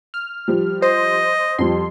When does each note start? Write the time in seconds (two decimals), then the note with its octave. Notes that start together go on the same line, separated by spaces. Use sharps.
0.14 F6
0.48 F3 G3
0.82 C5 D#5
1.59 F2 F3 G3 C6